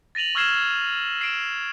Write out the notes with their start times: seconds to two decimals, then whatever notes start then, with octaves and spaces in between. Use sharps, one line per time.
0.15 A6 A#6 D#7 F7 F#7
0.35 C#6 E6 F6 G#6 C7 E7
1.21 C7 D7 E7